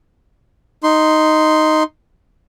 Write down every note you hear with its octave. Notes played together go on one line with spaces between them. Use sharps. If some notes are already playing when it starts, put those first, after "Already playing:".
D#4 C6